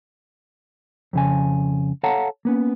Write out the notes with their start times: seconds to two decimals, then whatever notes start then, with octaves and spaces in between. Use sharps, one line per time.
1.13 F2 C#3 G#5
2.03 A4 C#5 F5 F#5 A5 A#5
2.45 A#3 B3 C#4